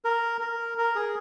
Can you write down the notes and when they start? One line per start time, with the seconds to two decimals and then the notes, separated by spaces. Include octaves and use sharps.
0.05 A#4
0.41 A#4
0.78 A#4
0.96 G#4